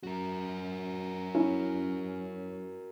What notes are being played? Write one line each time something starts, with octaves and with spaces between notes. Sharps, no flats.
F#2 F#4 A#4
C#4 E4